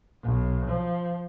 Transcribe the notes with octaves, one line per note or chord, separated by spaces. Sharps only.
B1
F3